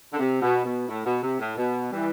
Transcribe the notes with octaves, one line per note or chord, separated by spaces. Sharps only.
D3
C3
B2
B2
A2
B2
C3
A2
B2
E3 G3